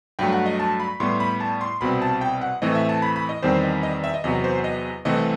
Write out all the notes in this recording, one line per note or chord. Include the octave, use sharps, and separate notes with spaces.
G2 F#3 A3 G5
F#5
D#5
A5
B5
A2 G3 B3 C6
B5
A5
C6
C2 B2 G3 C4 B5
A5
G5
F#5
A2 E3 A3 C4 D#5
E5
A5
B5
B5
D#5
E2 D#3 G3 C4 C5
D#5
D#5
E5
D#5
E2 C3 F#3 B3 D#5
C5
D#5
C2 C3 E3 A3 C4 D#5